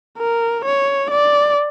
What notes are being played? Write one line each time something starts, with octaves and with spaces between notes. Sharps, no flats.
A#4
C#5
D5